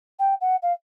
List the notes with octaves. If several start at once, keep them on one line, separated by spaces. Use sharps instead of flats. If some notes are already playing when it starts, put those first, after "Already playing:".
G5
F#5
F5